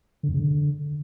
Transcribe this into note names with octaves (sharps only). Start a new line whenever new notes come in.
D3
F2
C#3
D3